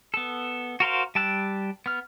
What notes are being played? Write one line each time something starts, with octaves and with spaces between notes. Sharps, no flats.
B3 A4
F#4 A#4 C5 F5
G3 G5 A5 E6 F#6
B3 F6